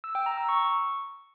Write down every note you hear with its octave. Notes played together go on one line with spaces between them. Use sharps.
E6
G5
A#5
E6
C#6